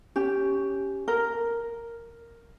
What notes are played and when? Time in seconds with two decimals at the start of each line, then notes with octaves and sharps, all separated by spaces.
0.16 C#4 G4
1.08 A#4